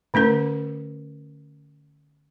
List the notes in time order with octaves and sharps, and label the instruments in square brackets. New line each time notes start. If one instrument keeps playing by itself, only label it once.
[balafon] D3 A3 C#4 A#4